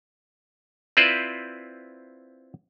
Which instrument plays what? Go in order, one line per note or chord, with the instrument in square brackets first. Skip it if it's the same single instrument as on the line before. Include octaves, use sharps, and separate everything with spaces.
[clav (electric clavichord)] C4 E4 F4 B4 C5 D5